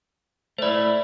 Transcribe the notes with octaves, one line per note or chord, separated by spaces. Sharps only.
A3 E4 C5 D5